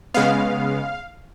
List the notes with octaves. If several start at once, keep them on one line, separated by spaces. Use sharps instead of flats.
C#3 G#3 B3 F5